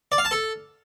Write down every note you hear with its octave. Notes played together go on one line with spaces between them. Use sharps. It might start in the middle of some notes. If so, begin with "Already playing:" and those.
D5
F5
A5
A4